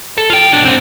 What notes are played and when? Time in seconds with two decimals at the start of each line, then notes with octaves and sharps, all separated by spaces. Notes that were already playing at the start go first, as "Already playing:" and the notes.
0.18 A4
0.30 F4 G5
0.52 B1 D4
0.65 G#2 C4